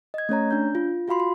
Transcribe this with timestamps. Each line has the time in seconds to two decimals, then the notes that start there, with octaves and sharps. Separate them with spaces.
0.14 D#5 G#6
0.29 A3 C#4 C#5 A#5
0.51 D4 G6
0.75 F4
1.08 F4 F#4 F5 B5 C6
1.20 C6